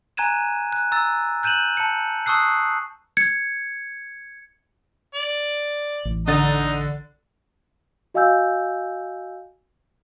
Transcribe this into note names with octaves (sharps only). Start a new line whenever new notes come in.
G#5 A#5 F#6 G#6 D#7 E7
F#6
A#5 E6 A6
F#6 G6 D#7 E7 F#7
A5 C#7
A5 C#6 D#6 E6 F#6 C7
G#6 C#7
D5
A1
D3 D#4 D#5 A6
F#4 D#5 F5 G#5 E6 G6